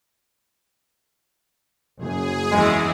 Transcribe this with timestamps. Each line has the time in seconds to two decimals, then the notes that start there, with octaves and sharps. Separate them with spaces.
1.99 F#1 F#2 F#3 G#4
2.52 E2 E3 G#3